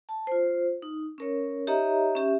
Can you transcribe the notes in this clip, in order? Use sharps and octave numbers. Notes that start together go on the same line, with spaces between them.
A5
F4 C5
D#4
C#4 A#4 C#5
D#4 G4 C#5 D#5 E5 A#5
C#4 G4 E5